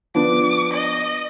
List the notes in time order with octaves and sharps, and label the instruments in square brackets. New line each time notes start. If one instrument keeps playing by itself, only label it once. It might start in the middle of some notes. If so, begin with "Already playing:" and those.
[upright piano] F3 B3 D4 [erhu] D6
[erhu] D#5